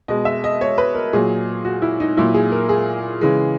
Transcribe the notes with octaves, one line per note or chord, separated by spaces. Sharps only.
B2 G#3 D#5
E5
D#5
C#5
B4
A#4
A#2 F#3 G#4
F#4
E4
D#4
A#2 F#3 E4
G#4
A#4
G#4
C#3 E3 G#3